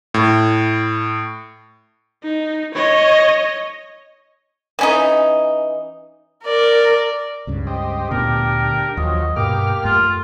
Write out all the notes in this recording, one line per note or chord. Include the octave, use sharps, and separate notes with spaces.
A2
D#4
C#5 D#5
E3 C#4 D#4
A#4 D5
C#2 G2 C#3
G4 C5 D#5
D2 A#2 B3 D4 G4 A#4
D#2 F3 F#3 D#5
G2 B2 A#3 G4 D6 F6
F#2 A3 F4